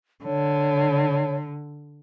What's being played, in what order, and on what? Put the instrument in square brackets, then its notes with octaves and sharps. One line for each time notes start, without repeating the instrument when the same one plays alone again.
[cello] D3 [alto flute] C#5